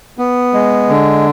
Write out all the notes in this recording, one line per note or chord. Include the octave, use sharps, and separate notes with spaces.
B3
G#3
D3